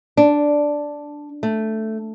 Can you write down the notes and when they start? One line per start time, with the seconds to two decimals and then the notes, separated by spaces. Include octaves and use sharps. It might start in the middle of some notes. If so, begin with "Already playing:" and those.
0.17 D4
1.43 A3